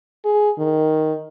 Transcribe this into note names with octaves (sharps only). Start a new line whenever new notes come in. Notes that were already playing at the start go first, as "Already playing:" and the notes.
G#4
D#3